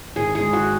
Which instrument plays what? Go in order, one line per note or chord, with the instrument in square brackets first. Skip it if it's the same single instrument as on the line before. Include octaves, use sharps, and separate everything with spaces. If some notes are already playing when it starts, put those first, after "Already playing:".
[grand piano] G#1 [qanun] G#4
[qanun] G#4
[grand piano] G#3
[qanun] F#4